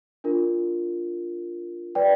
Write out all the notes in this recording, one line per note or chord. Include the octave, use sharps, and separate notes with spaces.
D4 F4 A#4
B4 D5 G5